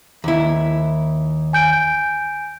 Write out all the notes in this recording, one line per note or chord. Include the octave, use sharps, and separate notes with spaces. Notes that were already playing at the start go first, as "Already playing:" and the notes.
D#2 E4
G#5 G6 D7